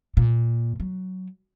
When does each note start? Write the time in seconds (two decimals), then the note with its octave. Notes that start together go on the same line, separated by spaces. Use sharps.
0.17 A#2
0.80 F#3